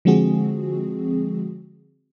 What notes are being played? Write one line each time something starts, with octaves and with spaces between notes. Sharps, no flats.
D3 F3 G#3 C4 F#4 G#4